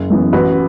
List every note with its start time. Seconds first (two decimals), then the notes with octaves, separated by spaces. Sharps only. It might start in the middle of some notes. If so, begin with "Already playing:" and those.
Already playing: F#1
0.10 F#2 E3 B3
0.32 A1 F#4 B4